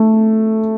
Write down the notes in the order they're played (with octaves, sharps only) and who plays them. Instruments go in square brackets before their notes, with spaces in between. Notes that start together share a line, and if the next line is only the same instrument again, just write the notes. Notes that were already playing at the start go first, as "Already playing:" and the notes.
Already playing: [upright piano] A3